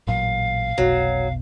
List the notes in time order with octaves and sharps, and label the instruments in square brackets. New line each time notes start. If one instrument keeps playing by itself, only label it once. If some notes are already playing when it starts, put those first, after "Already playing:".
[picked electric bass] A1 A#2 F#3 [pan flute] F5
[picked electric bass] F1 B1 B2 [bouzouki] F#3